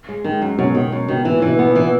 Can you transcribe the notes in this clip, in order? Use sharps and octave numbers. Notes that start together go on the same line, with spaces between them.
G#3
D#3 G#3
F#2
F#2 B2
B2 D#3
F#2
B2 D#3
A#2 E3
E3
B2
B3
A#2
E3